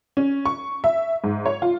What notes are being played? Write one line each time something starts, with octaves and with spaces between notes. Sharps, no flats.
C#4
C#6
E5
G#2
C#5
F4